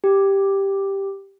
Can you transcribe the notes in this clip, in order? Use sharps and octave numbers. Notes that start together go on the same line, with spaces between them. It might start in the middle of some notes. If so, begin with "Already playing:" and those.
G4